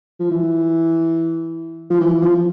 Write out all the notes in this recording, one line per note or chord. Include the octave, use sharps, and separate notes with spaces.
F3
E3
F3
E3
F3